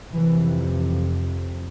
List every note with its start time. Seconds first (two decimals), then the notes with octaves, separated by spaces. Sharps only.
0.12 F2 C3 E3